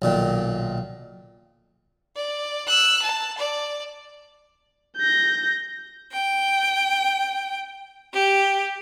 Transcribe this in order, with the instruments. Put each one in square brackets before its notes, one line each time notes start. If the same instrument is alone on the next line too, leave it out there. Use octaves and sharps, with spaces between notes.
[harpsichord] B1 A#2 D#3
[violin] D5
E6 F#6
A5
D5
[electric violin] G6 A#6
[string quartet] G5
G4